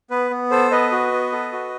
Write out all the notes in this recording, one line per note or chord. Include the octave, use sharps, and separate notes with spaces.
B3 B4
B3
A4 C5
B3 B4 D#5
F#4
B3
A4
F#4